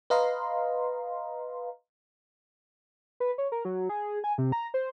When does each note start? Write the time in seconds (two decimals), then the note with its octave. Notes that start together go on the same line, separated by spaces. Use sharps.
0.10 B4 D#5 F5 A#5 C6
3.20 B4
3.38 C#5
3.52 A#4
3.65 F#3
3.89 G#4
4.24 G#5
4.38 C3
4.52 A#5
4.74 C5